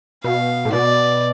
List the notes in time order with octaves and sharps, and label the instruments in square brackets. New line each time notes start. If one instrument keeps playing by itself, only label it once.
[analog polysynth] B2 [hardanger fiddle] F5
[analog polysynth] A2
[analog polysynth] B2 [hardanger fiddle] D5